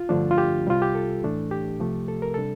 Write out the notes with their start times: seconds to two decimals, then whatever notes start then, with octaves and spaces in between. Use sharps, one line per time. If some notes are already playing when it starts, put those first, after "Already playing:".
Already playing: F4
0.09 G2 D3 F3 A3 D4
0.31 F4
0.38 G4
0.67 C2 C3 G3 F4
0.82 G4
0.95 A4
1.23 A2 E3 A3 D4
1.51 G4
1.80 C2 C3 F3 A3
2.08 A4
2.22 A#4
2.34 C3 G3 D4 A4